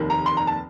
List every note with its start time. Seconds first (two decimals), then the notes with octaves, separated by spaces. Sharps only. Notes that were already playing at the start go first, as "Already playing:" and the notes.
Already playing: F1 D#2 D#3
0.10 A#5
0.26 C6
0.37 A#5
0.47 A5